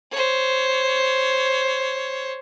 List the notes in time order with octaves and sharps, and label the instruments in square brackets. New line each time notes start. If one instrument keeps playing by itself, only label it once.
[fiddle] C5 C#5